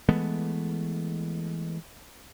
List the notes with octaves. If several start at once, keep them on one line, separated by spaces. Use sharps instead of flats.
E3 G#3 A3 B3